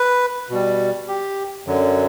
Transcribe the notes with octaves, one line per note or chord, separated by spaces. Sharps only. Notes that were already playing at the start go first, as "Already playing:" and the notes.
Already playing: B4
B2 G3
G4
F#2 D3 F#3